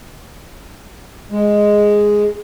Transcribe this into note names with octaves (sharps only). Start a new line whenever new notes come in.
G#3